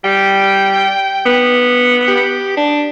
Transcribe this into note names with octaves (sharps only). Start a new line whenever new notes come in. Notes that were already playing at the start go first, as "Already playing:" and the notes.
G3 G5
B3
G4
D4